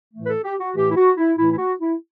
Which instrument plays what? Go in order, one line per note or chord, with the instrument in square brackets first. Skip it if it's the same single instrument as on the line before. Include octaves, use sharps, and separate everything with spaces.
[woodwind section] A2 E3 A3
B4
A4
G4
F#4
A2 E3 A3 G4
E4
F#4
E4
A2 E3 A3 E4
E4
F#4
E4